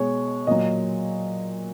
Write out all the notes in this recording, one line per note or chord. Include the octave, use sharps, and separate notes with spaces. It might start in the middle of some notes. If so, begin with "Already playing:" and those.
Already playing: B2 G#3 C#5
A#2 F#3 D#5